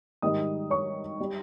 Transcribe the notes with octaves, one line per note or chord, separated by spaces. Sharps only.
G#2 D#3 G3 D#5 D#6
C#5 C#6
G3